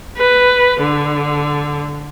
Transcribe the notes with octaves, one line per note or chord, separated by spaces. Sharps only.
B4
D3